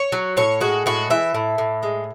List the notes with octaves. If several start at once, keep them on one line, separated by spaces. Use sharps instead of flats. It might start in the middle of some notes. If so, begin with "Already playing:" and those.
Already playing: C#5
F#3
A2 C#5
G#3 F#4
A2 F#4
E3 E5
A2
A2
G#3